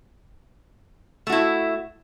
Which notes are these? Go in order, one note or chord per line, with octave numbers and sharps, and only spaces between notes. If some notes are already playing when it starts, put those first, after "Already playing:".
A3 E4 F#4